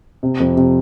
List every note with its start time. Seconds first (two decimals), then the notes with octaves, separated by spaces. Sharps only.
0.23 C3
0.40 F2
0.57 C3